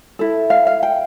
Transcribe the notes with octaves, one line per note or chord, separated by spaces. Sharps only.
E4 A4
F5
F5
G5